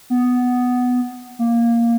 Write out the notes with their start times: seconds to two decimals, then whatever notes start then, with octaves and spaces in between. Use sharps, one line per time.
0.10 B3
1.39 A#3